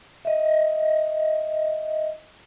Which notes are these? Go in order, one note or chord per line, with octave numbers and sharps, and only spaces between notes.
D#5 E5